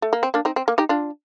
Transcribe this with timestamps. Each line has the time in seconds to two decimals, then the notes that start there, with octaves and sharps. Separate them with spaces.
0.02 A3
0.13 A#3
0.23 C4
0.34 A#3 D4
0.45 C4 D#4
0.56 C4
0.68 A#3
0.78 D#4 G4
0.89 D4 F4